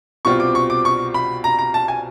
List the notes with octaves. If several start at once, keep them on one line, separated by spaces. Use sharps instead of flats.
C2 B2 G3 C4 F4 C#6
D6
C#6
D6
C#6
B5
A#5
A#5
A5
G#5